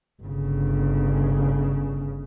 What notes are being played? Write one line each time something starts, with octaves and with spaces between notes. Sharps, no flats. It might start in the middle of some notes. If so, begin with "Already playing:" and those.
G1 C#3